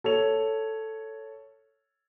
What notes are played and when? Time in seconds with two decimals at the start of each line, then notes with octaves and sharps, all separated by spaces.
0.04 A4 C#5 F7